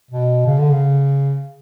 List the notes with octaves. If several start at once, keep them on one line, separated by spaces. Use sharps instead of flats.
B2
C#3
D3
C#3